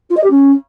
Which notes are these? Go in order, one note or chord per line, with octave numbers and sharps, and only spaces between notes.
F4
D#5
G4
C#4